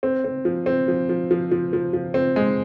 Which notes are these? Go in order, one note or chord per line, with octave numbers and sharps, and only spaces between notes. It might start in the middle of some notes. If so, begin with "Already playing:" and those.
C4
C4
F3
C4
F3
F3
F3
F3
F3
F3
C4
G#3